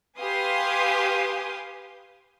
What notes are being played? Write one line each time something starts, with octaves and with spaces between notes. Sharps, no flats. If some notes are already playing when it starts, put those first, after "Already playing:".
G4 B4 F5 G#5 C6 D#6